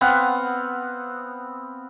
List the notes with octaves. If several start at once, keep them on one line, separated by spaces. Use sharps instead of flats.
B3 C4 F5 F#5